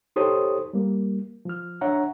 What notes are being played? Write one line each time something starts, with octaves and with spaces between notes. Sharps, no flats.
D#4 G4 A4 C5 C#5 D#6
G3 A#3
F3 F6
D4 C#5 E5 F#5 A#5